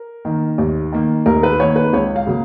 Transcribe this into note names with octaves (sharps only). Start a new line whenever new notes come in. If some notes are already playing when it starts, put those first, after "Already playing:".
Already playing: A#4
D#3 A#3
D#2
D#3 A#3
D#2 A#4
B4
D#3 A#3 C#5
B4
C#2 C#5
F5
C#3 F#3 A#3